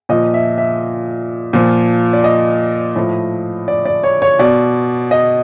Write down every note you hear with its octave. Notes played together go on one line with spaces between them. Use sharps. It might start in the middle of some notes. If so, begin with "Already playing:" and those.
A#2 F3 D#5
E5
E5
A#2 F3
D5
D#5
A2 F3
D5
D5
C#5
C#5
B2 D5
D#5